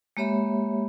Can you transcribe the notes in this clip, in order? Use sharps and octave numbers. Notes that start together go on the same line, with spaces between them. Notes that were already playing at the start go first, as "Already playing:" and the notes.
G#3 A#3 G4 C#5 E5 B5